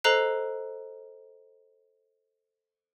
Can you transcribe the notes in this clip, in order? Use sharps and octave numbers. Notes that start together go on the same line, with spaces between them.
A4 C5 D#5 A#5 F#6 C7